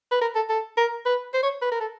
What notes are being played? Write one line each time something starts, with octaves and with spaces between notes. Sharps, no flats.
B4
A#4
A4
A4
A#4
B4
C5
C#5
B4
A#4
A4